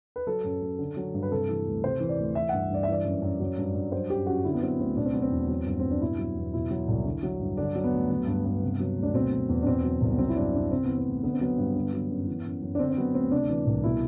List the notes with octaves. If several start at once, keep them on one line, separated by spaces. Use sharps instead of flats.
B4
F#3 A4
F#2
F#2
D3
F#3
G2
B4
C3 A4
E3
D2
C3 C5
E3
D5
D2
E3 E5
G2 F#5
G2 D5
E5
E3 D5
F#2
F#2
F#3
G2
G2
F#3 C5
F#2 G4
F#2 F#4
D3 E4
B3
F#3 C4
D2 C4
B2 D4
C4
F#3 B3
C4
E2
F#3
G2
G2 C4
D4
B2 E4
F#3
E2
B2 E4
F#3
C2
D3
F#3
G2
D3 D4
F#3
B3
D2
F#3
G2
G2
C3
F#3
D2
D4
B2 C4
F#3
E2
D4
B2 C4
F#3
C2
B3
F#3 C4
E4
G2 D4
G2 D4
C3 C4
E3 B3
C4
D2
D3 B3
C4
F#3 B3
G2
D3
F#3
F#2
E3
F#2
F#2
D4
D3 C4
C4
F#3 B3
D2 C4
C3 D4
E3
C2
B2 E4